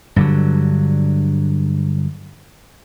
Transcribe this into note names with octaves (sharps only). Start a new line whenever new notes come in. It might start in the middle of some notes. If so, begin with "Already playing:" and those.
G2 D3 F#3